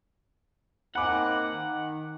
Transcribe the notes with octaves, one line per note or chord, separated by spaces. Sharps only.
A#3 C4 D#4 F#5 G#5 B5 D6
D#3